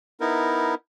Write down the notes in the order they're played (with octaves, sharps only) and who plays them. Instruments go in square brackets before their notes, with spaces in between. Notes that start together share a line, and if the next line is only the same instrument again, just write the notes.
[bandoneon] B3 D#4 E4 A#4